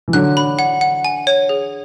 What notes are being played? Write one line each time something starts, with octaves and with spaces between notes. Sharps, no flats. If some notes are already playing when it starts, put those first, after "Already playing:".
E3
D3 F#3 F#6
B5
F#5
F#5
G#5
C#5
G#4